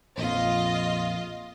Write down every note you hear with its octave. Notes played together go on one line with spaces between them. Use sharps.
A#1 F2 F4 D#5